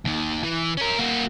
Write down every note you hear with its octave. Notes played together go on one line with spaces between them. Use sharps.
D#2 D#3
E3
C#4 A#4
A#3 F#4